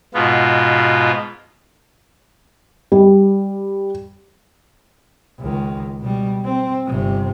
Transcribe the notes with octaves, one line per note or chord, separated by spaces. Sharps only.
G#2 B2 B3 F4
G3
C#2 D#3
B2 G3
C4
G1 C3